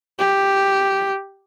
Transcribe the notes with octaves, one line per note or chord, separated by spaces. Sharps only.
G4